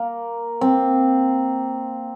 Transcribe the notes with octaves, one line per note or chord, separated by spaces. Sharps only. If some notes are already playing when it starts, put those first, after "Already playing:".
Already playing: A#3
C4